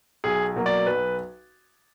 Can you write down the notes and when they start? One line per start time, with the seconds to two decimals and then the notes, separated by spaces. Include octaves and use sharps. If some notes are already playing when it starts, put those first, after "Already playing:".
0.24 B1 G#4
0.56 B2 F#3 A#3
0.66 D5
0.87 B1 B4